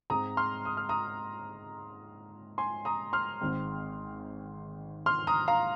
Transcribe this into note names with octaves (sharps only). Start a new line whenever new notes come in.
G#2 G#3 C4 A#5 D#6
C6 F6
D#6
F6
A#5 D#6
G#5 C6
A#5 D#6
C6 F6
G#1 G#2 G#3 C4
C6 F6
A#5 D#6
F5 A#5